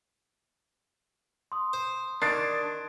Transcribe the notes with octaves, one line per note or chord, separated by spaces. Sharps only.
C6 D#6
C5
D#3 D4 F#6 G#6 A6 C7 D7